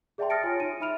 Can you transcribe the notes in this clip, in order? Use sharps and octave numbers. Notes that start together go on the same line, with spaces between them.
G#4 D5 E5 G5 A5 C6
D#6 F6 A6 A#6 C#7 D7
F4 C#5 G#5
D#4 D#7
D#4 E5 B5 F6 D7 F7